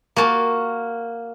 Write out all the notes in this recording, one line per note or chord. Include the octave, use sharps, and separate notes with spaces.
A#3 F#4 A5